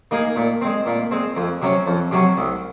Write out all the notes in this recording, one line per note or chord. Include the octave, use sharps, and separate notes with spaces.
A#3 D#4 G#4
A#2
G#3 C4
A#2
G#3 C4
F2
C3 F#3 C#4
F2
C3 F#3 C#4
C2